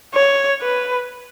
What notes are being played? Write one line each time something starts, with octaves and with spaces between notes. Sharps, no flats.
C#5
B4